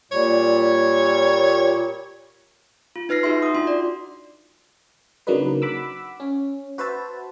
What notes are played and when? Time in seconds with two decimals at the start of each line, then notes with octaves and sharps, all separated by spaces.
0.12 A#2 G3 C#5
2.96 F4
3.09 D#4 B4 F6 A#6 C7
3.23 D#4 F#4 G#4 E5 C6
3.43 F#4 D#6
3.54 D4 F4 C6
3.67 D5
5.27 C#3 F#3 A#3 D4 D#4 B4
5.62 F#5 B5 D6 E6
6.20 C#4
6.78 F#4 B4 C5 E5 A5